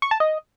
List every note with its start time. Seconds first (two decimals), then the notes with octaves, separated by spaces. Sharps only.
0.02 C#6
0.11 A5
0.20 D#5